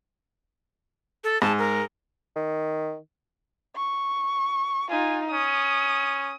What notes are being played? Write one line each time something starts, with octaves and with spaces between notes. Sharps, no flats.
A4
G#2 A5
A#4
D#3
C#6
D#4 F4 G#5
C#4 D#6